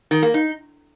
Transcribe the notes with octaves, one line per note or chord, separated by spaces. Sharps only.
D#3
A#3
D#4